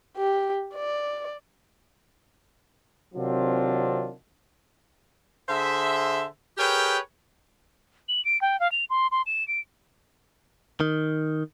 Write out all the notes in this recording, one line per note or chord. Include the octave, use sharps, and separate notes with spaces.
G4
D5
C3 D#3 F#3 C4 D4 F4
D3 G#4 C5 E5
G4 G#4 A#4 B4 C#5 G5
F#7
D7
G5
F5
F7
C6
C6
E7
D7
D#3